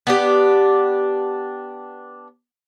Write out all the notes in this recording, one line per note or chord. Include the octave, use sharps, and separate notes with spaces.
B3 D4 G4